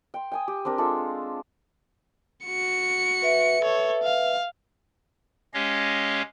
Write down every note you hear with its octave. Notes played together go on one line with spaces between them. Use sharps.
G5 C6
G5 G#5 D#6
G4
C4 D4 G4 A#4
G#3 D4 F4 A4
F#4 C#7
B4 E5
A4 C#5
F5
G#3 C#4 G4 C#5 D#5 F5